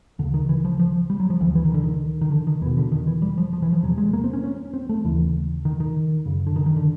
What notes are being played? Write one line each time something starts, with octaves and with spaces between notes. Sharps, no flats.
D2 C#3 D3
D#3
E3
F3
F3
G3
F#3
F3
D2 D3 E3
E3
D#3
D3
D#3
D#3
D3
D#3
E2 B2 E3
D3
D#3
E3
G3
F3
F3
E3
F3
E2 C3 F#3
G#3
A#3
C4
C#4
C#4
C4
A3
D#2 C#3 E3
D#3
D#3
F#2 C#3
D3
D#3
D#3
D3